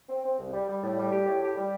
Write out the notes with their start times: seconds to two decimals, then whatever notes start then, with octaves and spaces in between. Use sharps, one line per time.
0.09 C4
0.24 C4
0.39 C2
0.52 G3
0.68 G3
0.82 A2
0.97 G3
1.11 G4
1.26 A2
1.42 G4
1.56 G3